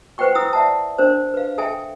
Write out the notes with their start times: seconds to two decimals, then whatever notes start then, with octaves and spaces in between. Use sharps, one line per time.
0.18 B4 C5 F#5 G5 C#6
0.35 E4 G#5 D#6 E6
0.53 D5 E5 F#5 A5
0.98 D4 A#4 C5
1.34 B4 F5
1.58 A4 E5 G5 G#5